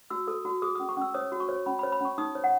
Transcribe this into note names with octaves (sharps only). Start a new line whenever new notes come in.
F#4 E6
A4
F#4
G#4 D#6
D#6
C#4
C#6
C#4 E6
C#5 D#6
F#4
C#6
C#5
C#4 B5
B5
C#5
B5
C#4 C#6
D#4 D#6
C#5
F#5